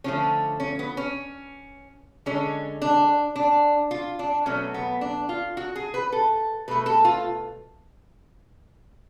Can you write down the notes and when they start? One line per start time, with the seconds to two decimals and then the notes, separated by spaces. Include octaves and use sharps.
0.04 D3 F3 A3 C#4
0.60 C#4
0.79 B3
0.97 C#4
2.26 D3 G#3 C#4
2.82 D4
3.36 D4
3.91 F4
4.19 D4
4.46 B2 F#3 A3 C#4
4.74 B3
5.01 D4
5.29 F4
5.57 F#4
5.76 G#4
5.94 B4
6.12 A4
6.68 B2 A3 B4
6.86 A4
7.05 F4